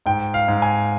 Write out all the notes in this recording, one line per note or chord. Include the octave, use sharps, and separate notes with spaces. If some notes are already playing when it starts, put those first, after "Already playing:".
G#2 G5
F5
G#2
G#5